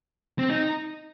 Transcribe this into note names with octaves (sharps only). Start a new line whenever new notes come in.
C4
D#4